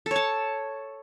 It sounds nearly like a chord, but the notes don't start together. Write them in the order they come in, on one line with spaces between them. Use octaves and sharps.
A4 C#5 A5